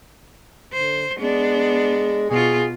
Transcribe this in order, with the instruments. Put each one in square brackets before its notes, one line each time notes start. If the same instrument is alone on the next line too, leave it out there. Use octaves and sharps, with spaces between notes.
[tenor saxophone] D3 [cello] C5
[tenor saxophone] G#3 [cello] B3 D4
[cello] B2 F4 [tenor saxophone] G#4